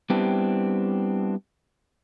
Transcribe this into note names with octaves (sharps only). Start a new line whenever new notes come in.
G3 B3 C4 D4 E4 G4